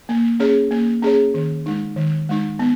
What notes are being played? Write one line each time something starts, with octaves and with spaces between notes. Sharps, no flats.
A#3
C#4 G#4 C#5
A#3
C#4 G#4 C#5
D#3
G#3 D#4
D#3
G#3 D#4
B3